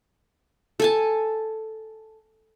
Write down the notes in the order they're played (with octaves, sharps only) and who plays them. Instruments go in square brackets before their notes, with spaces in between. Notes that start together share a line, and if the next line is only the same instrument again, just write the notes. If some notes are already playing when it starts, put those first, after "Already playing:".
[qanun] A4 G#5 A5